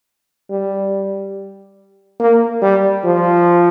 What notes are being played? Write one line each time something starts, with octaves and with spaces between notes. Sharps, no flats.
G3
A#3
G3
F3